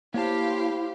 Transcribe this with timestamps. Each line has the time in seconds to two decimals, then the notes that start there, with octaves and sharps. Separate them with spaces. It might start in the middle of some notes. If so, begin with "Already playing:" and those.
0.14 A#3 E4 G4 C5 C#5 F5 A5